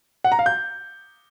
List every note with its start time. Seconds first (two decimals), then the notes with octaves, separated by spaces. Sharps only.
0.24 F#5
0.32 A#5
0.39 F5
0.46 G6